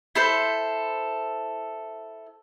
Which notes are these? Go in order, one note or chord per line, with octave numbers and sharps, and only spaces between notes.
E4 A4 C5